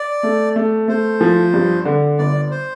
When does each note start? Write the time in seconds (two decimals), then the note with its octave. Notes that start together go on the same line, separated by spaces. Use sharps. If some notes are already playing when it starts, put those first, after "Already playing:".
Already playing: D5
0.23 A3
0.56 A3
0.88 A3 C5
1.21 F3
1.54 G2
1.85 D3
2.18 G1 D5
2.51 C5